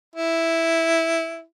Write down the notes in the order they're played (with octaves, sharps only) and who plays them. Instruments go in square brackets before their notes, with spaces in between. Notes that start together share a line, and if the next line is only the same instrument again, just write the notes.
[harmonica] E4